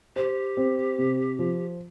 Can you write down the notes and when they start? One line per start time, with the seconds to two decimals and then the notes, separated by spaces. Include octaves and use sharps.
0.16 G4 C5
0.57 C4
0.98 C3
1.39 F3